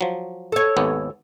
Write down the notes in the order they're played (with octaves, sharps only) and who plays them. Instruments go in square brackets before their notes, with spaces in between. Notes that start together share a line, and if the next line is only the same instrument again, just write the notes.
[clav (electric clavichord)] F3 F#3
[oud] A4 C#5
[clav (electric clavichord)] G#1 D#2 B3